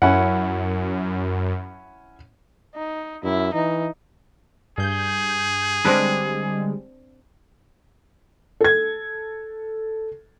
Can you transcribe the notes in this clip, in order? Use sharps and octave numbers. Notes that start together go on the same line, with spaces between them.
F#2 C#4 E4 F#5
D#4
F#2 E4
E3 D#4
G2 G#4 G6
D3 G3 G#3 C4 D4 B4
A4 G#6